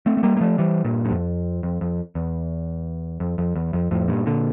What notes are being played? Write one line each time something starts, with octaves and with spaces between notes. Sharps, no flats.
A3 C4
A3
G3 A#3
A#3
F3 A3
E3 G3
G2 A#2
G2
F2
F2
F2
E2
F2
F2
E2
F2
F2 A2
G2 A#2
A#2 D3